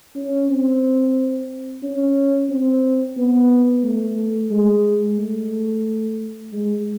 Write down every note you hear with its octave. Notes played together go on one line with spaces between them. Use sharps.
C#4
C4
C#4
C4
B3
A3
G#3
A3
G#3